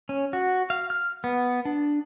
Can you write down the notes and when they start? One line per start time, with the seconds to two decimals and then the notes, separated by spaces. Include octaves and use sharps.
0.09 C#4
0.33 F#4
0.70 F5
0.90 F6
1.24 B3
1.65 D4